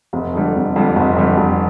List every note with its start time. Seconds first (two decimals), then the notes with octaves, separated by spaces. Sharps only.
0.13 F1
0.33 F2 D3 G3
0.55 F1
0.76 F2 D3 G3
0.96 F1
1.16 F2 D3 G3
1.37 F1